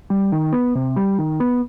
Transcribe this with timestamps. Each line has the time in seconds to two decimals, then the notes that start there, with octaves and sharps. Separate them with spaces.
0.10 G3
0.32 D#3
0.53 B3
0.75 C3
0.96 G3
1.19 D#3
1.40 B3